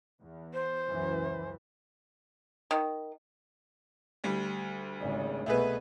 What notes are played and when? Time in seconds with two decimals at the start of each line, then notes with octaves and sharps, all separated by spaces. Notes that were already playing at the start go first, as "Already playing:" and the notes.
0.22 E2
0.54 C5
0.87 C#2 F#2 E3
2.71 D#3
4.24 D2 G3
5.00 G#1 C#3
5.46 C2 B2 A3 G#4 B4